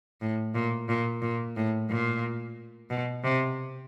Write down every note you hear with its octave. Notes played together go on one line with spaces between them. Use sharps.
A2
A#2
A#2
A#2
A2
A#2
B2
C3